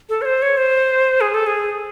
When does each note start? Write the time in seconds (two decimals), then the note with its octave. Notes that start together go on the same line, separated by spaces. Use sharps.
0.09 A4
0.22 C#5
0.25 C5
0.42 C#5
0.57 C5
1.21 G#4
1.34 A4
1.47 G#4